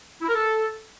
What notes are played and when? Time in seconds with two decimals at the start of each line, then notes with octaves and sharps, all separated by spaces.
0.22 E4
0.28 A#4
0.35 A4